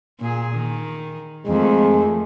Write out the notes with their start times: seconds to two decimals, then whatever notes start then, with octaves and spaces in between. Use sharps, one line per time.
0.20 A#2 G#4
0.54 D#3
1.47 F2 D#3 G#3 A3